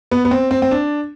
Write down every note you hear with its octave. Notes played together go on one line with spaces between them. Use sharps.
B3
B3
C4
C4
C4
D4